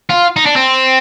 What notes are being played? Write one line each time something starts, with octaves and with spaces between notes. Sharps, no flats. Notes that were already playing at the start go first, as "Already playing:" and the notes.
F4
D#4
D4
C4